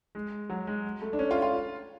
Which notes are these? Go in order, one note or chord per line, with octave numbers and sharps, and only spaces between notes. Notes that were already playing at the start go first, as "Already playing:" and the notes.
G#3
F#3
G#3
A3
D4
C#4
F4
F4